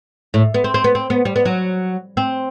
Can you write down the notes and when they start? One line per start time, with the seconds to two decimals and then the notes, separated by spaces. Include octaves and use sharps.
0.34 A2
0.54 B3
0.64 C4
0.74 C4
0.84 B3
0.95 C4
1.10 B3
1.25 G3
1.36 B3
1.45 F#3
2.17 C4